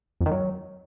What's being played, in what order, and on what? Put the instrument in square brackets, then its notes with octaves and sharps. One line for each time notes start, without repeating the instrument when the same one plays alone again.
[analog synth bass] F2
D#3
F#3